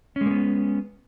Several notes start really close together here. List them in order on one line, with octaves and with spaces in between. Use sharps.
C#4 G#3 A#3 B3